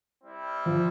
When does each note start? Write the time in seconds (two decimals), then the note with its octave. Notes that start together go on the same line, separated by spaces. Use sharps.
0.22 G3 C4 E4
0.66 F3